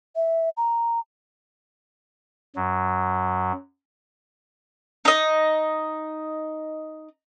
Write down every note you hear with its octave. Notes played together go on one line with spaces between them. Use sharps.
E5
A#5
F#2 F#3
D#4 D#5